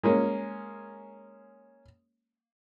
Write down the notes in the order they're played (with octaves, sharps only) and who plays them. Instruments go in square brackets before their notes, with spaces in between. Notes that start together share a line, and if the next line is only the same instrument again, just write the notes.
[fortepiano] G#3 A#3 C#4